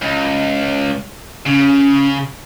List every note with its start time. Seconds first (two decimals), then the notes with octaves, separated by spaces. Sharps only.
0.02 C#2
1.46 C#3 C#4